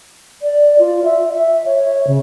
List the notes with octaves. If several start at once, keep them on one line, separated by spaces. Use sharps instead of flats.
D5
F4
E5
E5
C#5
C#3